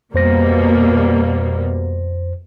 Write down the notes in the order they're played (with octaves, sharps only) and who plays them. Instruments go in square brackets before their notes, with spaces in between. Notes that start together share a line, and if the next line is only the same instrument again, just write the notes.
[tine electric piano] F2 C5 A#6 [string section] B2 G3 A#3